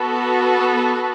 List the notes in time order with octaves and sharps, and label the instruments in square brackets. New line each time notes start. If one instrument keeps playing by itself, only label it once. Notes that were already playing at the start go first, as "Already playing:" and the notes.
Already playing: [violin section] B3 F#4 A4